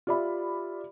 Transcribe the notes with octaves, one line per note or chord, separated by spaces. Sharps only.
F4 G4 D5 E5 B5